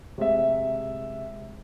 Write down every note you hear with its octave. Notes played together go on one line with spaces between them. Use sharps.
C3 G#3 E5